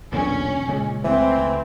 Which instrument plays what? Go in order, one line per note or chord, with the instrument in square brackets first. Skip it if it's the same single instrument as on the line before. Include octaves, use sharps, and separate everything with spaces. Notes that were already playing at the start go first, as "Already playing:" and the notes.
[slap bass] B1 [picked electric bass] E2 A#2 D3 [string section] C#4
[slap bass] A#2 [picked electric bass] C#3 G#3
[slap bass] C#2 A3 [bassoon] E3 [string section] C4